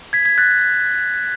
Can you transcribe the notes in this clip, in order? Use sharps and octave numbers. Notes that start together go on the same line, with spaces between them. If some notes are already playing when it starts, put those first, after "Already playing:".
G#6 B6
G#6 B6
F#6 A6